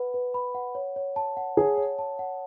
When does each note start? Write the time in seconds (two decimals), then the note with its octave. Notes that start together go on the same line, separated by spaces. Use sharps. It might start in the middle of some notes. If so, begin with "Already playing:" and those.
Already playing: B4 F#5 B5
0.14 B4
0.34 B5
0.55 F#5
0.75 C#5
0.96 C#5
1.16 A5
1.37 F#5
1.57 G#4 C#5
1.78 C#5
1.99 A5
2.19 F#5